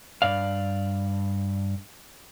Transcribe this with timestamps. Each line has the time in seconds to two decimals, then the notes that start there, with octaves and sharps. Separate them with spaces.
0.22 G2 D5 F5